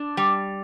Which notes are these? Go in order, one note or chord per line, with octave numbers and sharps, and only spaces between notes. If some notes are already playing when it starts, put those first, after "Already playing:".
Already playing: D4
G3